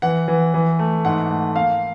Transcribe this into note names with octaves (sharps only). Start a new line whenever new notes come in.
E3 F#5
E3
E3
A3
G#2 F#5
A3
A#3 F5